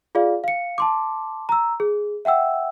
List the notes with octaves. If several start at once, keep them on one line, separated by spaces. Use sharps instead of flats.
F4 G#4 D5 F5
F5 C#7
A5 C6 D6
A#5 E6
G#4
E5 F#5 G5 E6